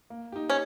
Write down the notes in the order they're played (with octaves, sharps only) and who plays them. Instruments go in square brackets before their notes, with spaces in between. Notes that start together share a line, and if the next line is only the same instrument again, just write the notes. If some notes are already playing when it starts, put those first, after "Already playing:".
[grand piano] A#3
D#4 G4
[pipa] C#4